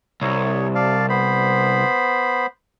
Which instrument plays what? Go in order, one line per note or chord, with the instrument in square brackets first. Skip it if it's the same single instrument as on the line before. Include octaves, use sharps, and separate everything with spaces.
[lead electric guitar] C2 [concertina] C#5
[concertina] D5 F5 A5
B3 C5 B5